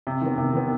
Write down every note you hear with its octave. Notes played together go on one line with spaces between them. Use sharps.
C3
D#3 B3
C3
D#3 B3